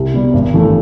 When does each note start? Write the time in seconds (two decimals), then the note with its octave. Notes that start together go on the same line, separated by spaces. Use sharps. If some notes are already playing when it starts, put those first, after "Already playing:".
Already playing: C2
0.14 B2 G3
0.34 G#1
0.54 G2 E3 A3